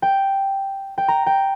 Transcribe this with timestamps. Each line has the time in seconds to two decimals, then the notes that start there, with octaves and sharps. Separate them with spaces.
0.02 G5
0.98 G5
1.08 A#5
1.26 G5